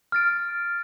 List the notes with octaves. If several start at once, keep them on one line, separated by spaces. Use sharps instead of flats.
F6 A6 D7